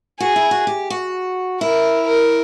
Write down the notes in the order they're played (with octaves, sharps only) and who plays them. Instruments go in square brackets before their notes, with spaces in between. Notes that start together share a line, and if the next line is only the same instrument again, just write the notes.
[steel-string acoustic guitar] F#4 [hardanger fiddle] G#4
[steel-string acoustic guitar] E4
F#4
G4
F#4
[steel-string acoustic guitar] E4 [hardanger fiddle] A#4
[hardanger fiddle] A#4